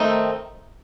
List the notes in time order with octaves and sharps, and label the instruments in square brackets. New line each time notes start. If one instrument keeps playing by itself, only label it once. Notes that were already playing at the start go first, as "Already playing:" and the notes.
Already playing: [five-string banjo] D#3 A3 C4 D#4